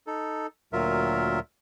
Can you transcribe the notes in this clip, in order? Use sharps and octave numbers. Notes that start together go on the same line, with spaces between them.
D#4 A4
D2 A#2 F#3 F4 A#4 E5